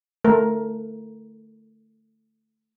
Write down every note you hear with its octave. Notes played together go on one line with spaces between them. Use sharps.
A3 A#4